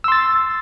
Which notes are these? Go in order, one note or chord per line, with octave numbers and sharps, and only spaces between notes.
C6 E6 A6